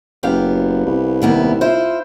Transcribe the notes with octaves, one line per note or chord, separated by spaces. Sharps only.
F#1 B3 G4 F5
C2
D#2 B3 E4
E4 F4 C5